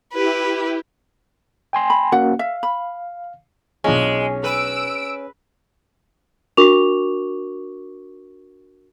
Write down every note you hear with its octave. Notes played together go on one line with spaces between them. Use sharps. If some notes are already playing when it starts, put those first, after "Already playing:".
E4 G4 B4
G5 G#5 C6
B5
A#3 C#4 F#4 F#5
E5 F5
B5
B1 G#3 C#4 D4 F4
B4 E6 D7
D4 F#4 A#4 C#6 D6 F7